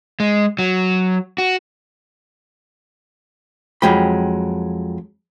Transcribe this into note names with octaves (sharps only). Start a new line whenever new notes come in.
G#3
F#3
F#4
F2 F#3 G#3 G5 B5